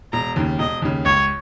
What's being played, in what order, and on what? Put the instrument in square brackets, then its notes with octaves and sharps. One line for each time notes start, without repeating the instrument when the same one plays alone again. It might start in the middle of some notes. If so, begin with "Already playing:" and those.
[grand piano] E1 [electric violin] A#5
[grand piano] D#2 C#3
[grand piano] E1 [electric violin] D#5
[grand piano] D#2 C#3
[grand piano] C#2 [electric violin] C#5